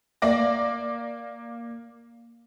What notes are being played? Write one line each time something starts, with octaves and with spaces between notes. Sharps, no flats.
A#3 D5 D6 A#6